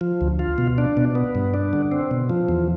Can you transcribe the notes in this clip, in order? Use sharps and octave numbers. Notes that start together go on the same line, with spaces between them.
F3
D2
F4
B2
D4
B2
B3
G2
D4
D3
C4
B2
F3
E2